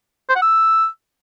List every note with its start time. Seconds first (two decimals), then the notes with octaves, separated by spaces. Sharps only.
0.29 C5
0.36 F#5
0.42 E6